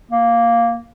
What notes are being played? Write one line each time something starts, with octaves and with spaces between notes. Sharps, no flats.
A#3